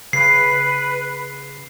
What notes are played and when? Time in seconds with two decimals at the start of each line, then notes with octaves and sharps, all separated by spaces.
0.13 C#3 B4 C7